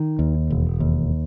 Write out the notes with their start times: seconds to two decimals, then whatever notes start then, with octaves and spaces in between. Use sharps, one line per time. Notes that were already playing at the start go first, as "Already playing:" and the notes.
Already playing: D#3
0.19 D#2
0.50 E1
0.80 D#2